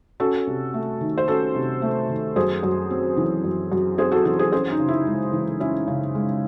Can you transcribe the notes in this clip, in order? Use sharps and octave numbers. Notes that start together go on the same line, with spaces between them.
C#4 F#4 A4
C3
A3
D#3
C5
C#4 F#4 A4
C3
A3
D#3
F#2 G#4 C5
F#2
C4
E3
F#2
F#2
C4 G#4 C5
F#4 A4
E3 F#4 A4
G#4 C5
C#4 G#4 C5
D#4
C#3
E4
G#3
E3
C#4 E4
C#3
G#3